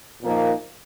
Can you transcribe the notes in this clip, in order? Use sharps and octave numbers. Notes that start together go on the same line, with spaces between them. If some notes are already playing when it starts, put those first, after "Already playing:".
A#2 F3 A#3 D#4